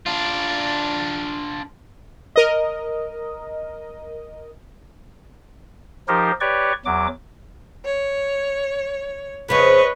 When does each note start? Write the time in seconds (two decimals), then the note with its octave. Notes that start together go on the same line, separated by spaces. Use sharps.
0.06 D4 F4
2.36 A#4 D#5
6.08 F3 D#4 G4 A#4 C5
6.41 G4 B4 C#5 D5 C#6
6.85 E2 F#3 D6
7.83 C#5
9.48 F2 C#3 F3 B4 C#5 D#5